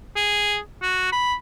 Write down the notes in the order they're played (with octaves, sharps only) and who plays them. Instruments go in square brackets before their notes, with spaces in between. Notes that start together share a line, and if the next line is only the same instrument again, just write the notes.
[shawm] G#4
F#4
B5